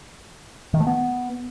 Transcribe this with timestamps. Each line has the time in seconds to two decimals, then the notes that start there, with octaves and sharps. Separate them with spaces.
0.74 D#3
0.80 A3
0.87 B3